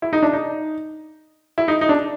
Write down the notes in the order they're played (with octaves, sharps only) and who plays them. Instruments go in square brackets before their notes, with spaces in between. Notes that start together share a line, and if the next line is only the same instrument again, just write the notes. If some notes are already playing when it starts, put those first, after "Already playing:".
[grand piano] E4
D#4
D4
D#4
E4
D#4
D#4
D4